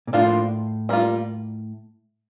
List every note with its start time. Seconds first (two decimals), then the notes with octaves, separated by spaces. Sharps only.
0.07 A#2
0.13 A2 F3 A#3 D4 F4
0.89 G3 A#3 F4